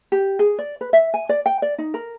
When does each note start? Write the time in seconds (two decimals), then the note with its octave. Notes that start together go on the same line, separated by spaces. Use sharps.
0.12 G4
0.39 G#4
0.58 D5
0.81 B4
0.93 E5
1.14 G#5
1.29 D5
1.46 G5
1.62 D5
1.78 D#4
1.94 A#4